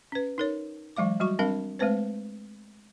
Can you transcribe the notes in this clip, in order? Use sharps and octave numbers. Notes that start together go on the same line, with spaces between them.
C#4 B4
D#4 A#4 C#5
E3 F#3 G#3 F5 D6
F#3 G3 F#4 C#6
G3 C4 D4 A#4 F5
G#3 A3 C4 B4 C5